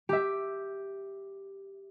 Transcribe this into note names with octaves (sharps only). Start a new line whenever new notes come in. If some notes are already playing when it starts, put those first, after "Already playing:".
G4 E5